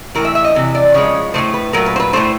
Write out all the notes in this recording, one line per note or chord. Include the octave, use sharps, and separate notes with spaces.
A2 E3 A3 A#4
E5
E5
D#5
C3 E3
D5
C#3 F3 G#3 C#5
A2 F3 A3 C5
B4
A#2 F#3 A3 A#4
B4
C5
B4
A2 F#3 A3 C5